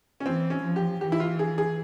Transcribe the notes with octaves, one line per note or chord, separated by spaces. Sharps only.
C#4
E3 C4
C#4
F3
G4
E3 G4
E4
F4
G#4
G#4